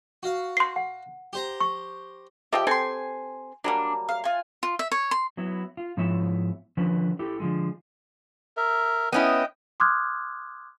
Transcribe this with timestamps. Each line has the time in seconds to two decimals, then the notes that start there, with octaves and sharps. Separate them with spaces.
0.23 F#4 F5
0.57 C6 C7
0.76 F#5
1.33 G4 C5 A#5
1.60 C#6
2.53 F3 G4 D#5 E5 G5
2.67 C4 A4 G5 G#5 C6
3.64 F#3 G3 A#3 D4
4.09 F5
4.24 F4 G#5
4.63 F4
4.79 E5
4.92 C#5
5.11 C6
5.37 F#3 B3 E4
5.77 F4
5.97 G#2 F3 B3 E4 C#5 E5
6.77 D3 D#3 F3 C#4 B4
7.19 E4 G4 A4
7.40 D3 F3 G#3
8.57 A#4 E5
9.12 B3 C#4 E4 D#5 G5
9.80 C6 D6 D#6 F6 F#6 G#6